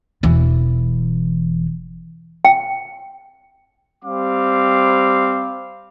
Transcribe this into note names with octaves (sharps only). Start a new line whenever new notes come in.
E1 E3
G5
G3 C4 F5 D6